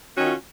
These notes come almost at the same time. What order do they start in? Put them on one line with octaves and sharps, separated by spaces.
F#4 C#4 D#3 F4